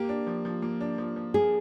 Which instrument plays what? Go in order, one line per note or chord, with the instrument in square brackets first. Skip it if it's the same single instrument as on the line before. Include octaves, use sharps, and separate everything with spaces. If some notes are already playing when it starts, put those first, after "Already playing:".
Already playing: [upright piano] A#3 [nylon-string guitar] G4
[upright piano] D4
F3
F3
A#3
D4
F3
F3
[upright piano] A#3 [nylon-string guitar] G#4